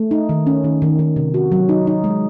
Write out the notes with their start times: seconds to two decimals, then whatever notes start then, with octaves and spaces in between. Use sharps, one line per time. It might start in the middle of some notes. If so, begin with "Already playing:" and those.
Already playing: A3
0.11 D#4
0.29 D#3
0.47 C#4
0.64 D#3
0.82 D#3
0.99 D#3
1.16 C3
1.34 F#4
1.52 F#3
1.69 D#4
1.87 D#4
2.04 G#3